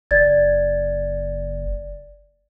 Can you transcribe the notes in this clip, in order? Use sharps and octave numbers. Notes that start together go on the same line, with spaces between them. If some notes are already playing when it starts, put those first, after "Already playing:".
F#1 D5 G#6 A6